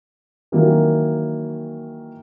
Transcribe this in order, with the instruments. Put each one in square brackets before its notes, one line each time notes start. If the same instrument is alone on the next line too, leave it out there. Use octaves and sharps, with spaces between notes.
[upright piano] D#3 E3 F#3 A#3